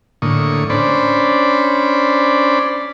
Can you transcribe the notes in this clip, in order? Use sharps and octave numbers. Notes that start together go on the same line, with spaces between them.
A2 D3 A#3 C#6 D#6
C#4 D4 C5 D5 B5